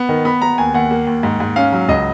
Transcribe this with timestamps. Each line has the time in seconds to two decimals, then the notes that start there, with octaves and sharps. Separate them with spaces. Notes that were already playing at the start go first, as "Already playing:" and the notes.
Already playing: B3
0.09 D#3
0.25 B3 B5
0.42 B3 A#5
0.58 D#2 G#5
0.74 D#2 F#5
0.91 A#3
1.07 D#2
1.23 G#2
1.40 G#2
1.56 C#4 F5
1.73 F#3
1.88 C#2 D#5